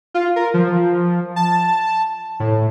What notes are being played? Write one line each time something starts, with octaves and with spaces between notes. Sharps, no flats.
F4
A#4
F3
A5
A2